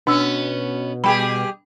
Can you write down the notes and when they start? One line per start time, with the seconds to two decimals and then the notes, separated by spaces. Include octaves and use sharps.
0.07 B2 B3 C#4 D4 E6
1.04 G3 G4 G#4 G5 B5